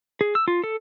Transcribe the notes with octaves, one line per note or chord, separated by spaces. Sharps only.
G#4
E6
F4
A4